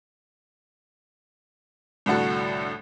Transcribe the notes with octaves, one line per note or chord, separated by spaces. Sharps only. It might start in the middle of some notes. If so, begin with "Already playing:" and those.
C2 A2 D3 F#4 A4